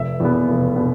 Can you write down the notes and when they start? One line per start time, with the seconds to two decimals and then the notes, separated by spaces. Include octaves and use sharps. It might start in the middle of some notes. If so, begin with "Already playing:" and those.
Already playing: F1 E5
0.20 E2 B2 B3
0.48 F1
0.76 B2 B3